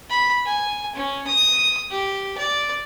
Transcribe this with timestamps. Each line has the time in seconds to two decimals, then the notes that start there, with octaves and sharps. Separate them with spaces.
0.10 B5
0.46 G#5
0.95 C#4
1.27 D#6
1.91 G4
2.38 D5